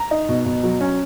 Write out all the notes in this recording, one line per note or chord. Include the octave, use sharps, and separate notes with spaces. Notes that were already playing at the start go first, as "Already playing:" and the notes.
Already playing: A#5
D#4
B2
B2
F#3
C#4